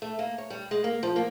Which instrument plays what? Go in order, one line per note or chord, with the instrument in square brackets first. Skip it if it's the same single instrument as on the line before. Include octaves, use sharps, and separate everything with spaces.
[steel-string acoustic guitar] A3
A#3
C#5
G3
G#3
A#3
F3
A#3